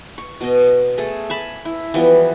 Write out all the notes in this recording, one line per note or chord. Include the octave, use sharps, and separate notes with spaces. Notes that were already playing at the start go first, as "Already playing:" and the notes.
C#6
B2 D#5
A3 G#4 A4
G#5 A5 B5
E4
E3 F3 G3 B3